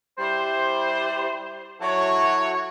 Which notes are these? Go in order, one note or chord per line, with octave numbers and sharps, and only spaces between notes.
G3 E4 G4 C5
F#3 E4 F#4 A4 C#5